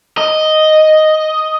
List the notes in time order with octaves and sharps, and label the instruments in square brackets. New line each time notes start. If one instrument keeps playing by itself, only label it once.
[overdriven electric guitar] D#5